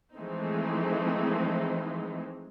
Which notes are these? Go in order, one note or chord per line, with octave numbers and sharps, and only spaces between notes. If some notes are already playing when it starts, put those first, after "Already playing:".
E3 F3 G#3 A3 C4 D#4